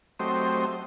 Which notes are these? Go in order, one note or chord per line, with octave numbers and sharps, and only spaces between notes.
F#3 A3 C4 G4 C5 D#5